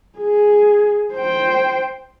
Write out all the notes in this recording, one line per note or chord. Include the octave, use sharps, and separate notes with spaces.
G#4
C5 G5